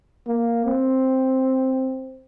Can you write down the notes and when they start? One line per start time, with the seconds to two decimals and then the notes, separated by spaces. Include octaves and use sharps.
0.27 A#3
0.65 C4